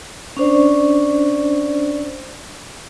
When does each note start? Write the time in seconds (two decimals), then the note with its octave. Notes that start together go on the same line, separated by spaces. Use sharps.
0.37 C#4 D4 C5 D5